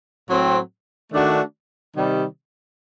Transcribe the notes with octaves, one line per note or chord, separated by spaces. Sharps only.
A2 F#3 C4
D#3 A3 D4 F#4
C3 D#3 G3